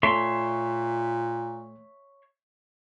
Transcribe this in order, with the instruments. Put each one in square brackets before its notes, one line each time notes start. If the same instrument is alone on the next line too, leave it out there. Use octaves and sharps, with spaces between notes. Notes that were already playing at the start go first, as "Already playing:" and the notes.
[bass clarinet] A#2 [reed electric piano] A3 [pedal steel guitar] C#5 E5 C6